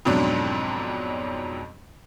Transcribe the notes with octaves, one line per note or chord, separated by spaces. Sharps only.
F2 G#2 B2 F#3 D4